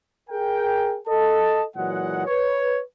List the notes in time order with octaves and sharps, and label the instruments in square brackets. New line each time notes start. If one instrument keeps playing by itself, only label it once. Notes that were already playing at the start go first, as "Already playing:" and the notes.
[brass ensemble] G#4 A#4 G5
A4 D#5 A5
A#2 E3 F#3 G#3 F#5
B4 C#5